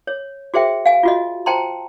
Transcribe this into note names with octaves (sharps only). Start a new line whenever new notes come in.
C#5
F#4 G#4 C5 E5 G5
F5 G#5
F4 F#4 D#5
C5 G5 A5 A#5 C6